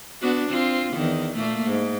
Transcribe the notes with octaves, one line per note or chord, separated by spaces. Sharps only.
B3 D4 F#4
C4 F4
E2 D#3
A#2 A3 A#3
G#2